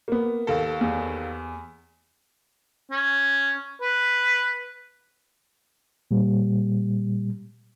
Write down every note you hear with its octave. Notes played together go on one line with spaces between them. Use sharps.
A#3 B3
D#2 A4
E2
C#4
B4
A#2 G3